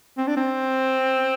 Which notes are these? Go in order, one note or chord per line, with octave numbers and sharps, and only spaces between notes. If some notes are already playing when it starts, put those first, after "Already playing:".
C4
D4
C4